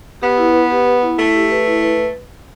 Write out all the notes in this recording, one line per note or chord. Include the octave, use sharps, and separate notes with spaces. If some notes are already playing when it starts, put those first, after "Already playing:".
B3 G4
E4
B4
G4
B4
E4
A3 E4
G4
B4
E4
B4